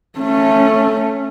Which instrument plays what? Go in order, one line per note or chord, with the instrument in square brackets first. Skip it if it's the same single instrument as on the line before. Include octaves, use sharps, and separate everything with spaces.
[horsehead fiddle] A3 C#4